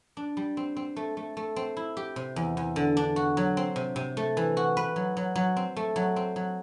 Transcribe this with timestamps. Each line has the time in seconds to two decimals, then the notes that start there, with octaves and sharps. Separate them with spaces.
0.17 D4
0.37 G3
0.57 C4
0.77 C4
0.96 A3
1.17 A3
1.37 A3
1.56 C4
1.77 E4
1.97 G4
2.16 C3
2.36 E2
2.57 E2
2.76 D3
2.97 D4
3.16 F#4
3.37 F#3
3.57 C4
3.76 C3
3.96 C3
4.17 A3
4.37 E3
4.57 F#4
4.77 B4
4.96 F#3
5.17 F#3
5.35 F#3
5.57 C4
5.76 A3
5.96 F#3
6.16 C4
6.36 F#3